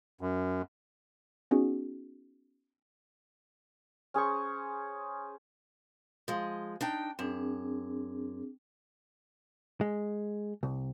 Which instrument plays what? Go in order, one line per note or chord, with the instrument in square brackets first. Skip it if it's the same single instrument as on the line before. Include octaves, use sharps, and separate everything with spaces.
[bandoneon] F#2
[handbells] B3 C#4 D#4 F#4 G#4
[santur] C#4 G#4 C5 C#6
[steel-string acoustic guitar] F3 G#3
D4 D#4 G5
[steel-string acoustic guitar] F#2 [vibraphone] C4 D4 G#4
[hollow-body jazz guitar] G#3
C2